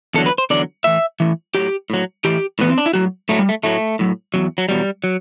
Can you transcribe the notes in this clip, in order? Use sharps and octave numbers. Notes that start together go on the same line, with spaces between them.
E2 D3 F#3 A4
B4
C5
E2 D3 F#3 D5
A2 E3 E5
A2 E3
A2 F#3 G4
A2 F#3
A2 E3 G4
A2 E3 B3
C4
D4
E4
A2 F#3 F#4
A2 F#3 A3
G3
A3
A2 F#3 A3
A2 F#3
E2 B2 F#3
F#3
E2 B2 F#3 G3
F#3